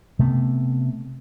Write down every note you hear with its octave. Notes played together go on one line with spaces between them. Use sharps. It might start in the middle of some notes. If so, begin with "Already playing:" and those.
C3 A3 B3